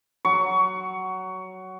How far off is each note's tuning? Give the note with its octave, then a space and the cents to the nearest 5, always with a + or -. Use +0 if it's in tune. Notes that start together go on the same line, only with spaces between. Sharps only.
F#3 +15 C#6 +15